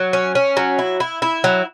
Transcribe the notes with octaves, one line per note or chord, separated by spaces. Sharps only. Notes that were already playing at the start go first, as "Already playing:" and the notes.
Already playing: F#3
C#4
C#4
F#3
E4
E4
E4
F#3